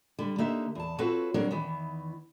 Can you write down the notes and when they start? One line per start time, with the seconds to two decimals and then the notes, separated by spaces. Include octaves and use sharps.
0.19 D3 G3
0.38 D3 A#3 D#4 G4 E5
0.75 E2 A5
0.98 C4 F4 F#4 A4 B4 C#5
1.34 F#3 G3 C4 D4 A#4 C#5
1.51 E2 D#3 E3